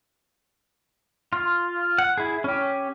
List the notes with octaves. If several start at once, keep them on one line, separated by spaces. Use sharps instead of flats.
F4
F#5
E4 G#4
C#4 G4